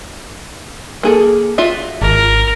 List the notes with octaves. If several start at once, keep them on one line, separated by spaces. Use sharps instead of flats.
A#3 G#4 A4
F4 F#4 E5
G#1 A#4